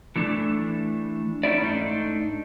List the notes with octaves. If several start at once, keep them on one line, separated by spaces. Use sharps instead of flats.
E3 A3 D4
A3 C#4 D#4 E4 D5
G#2 A3 D4 D#4